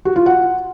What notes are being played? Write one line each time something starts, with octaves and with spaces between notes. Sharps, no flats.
F#4
F4
F#5